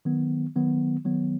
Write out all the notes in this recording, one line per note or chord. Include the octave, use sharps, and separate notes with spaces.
D#3 F#3 B3
D#3 F#3 B3
D#3 F#3 B3